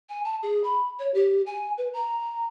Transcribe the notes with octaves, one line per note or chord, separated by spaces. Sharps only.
G#5
A5
G#4
B5
C#5
G4
G#5
B4
A#5